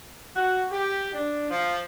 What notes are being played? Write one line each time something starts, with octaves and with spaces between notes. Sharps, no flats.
F#4
G4
D4
F3